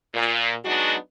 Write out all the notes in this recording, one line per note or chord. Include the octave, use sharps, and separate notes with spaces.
A#2
F#3 G#3 B3 D4 D#4 F#4